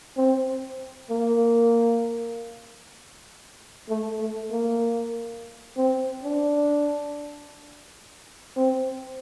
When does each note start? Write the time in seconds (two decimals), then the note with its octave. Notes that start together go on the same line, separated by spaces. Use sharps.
0.17 C4
1.10 A#3
3.89 A3
4.20 A3
4.51 A#3
5.77 C4
6.23 D4
8.56 C4